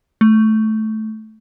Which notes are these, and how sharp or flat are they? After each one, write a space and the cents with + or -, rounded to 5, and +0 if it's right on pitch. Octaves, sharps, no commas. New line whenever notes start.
A3 -15